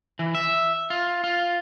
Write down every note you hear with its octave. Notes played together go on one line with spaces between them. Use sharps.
E3
E5
F4
F4